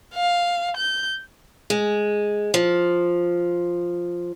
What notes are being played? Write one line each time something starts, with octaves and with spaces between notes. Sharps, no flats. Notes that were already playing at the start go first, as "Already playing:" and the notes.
F5
G6
G#3
F3